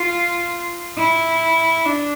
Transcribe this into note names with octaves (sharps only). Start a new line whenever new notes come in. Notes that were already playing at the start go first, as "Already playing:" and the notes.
Already playing: F4
E4
D4